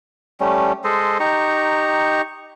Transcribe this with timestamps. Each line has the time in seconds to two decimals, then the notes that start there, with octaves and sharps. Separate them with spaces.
0.40 G3 A3 C#4
0.84 G#3 A4 C5 D#5
1.20 D#4 G4 A#5 C#6